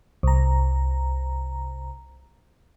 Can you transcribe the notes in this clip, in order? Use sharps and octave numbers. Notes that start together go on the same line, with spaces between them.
C2 A#5